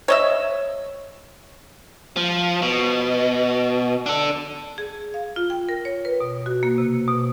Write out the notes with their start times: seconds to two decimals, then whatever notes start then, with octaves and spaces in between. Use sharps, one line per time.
0.08 C#5 D#5 E5
2.17 F3
2.62 B2
4.06 D4 A4
4.78 G#4
5.14 F5
5.36 F4
5.50 G5
5.69 A#4
5.85 C#5
6.05 B4
6.20 B2
6.46 F#4
6.63 A#3
6.78 C3
7.08 B2